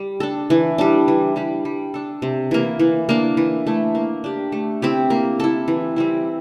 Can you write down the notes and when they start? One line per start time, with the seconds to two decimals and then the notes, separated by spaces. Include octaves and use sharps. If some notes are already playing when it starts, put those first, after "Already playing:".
Already playing: G3
0.20 D4 A4
0.50 E3
0.78 G3 D4
1.08 E3
1.36 G3 D4 G4
1.65 G3
1.94 D4 A4
2.22 C3
2.51 E3 A#3
2.79 E3
3.09 A#3 D4
3.37 E3
3.67 A3 E4
3.95 A#3
4.24 D4 G4
4.52 A3
4.82 C4 E4 G4
5.10 A#3
5.40 E4 A4
5.68 E3
5.96 G3 C4 E4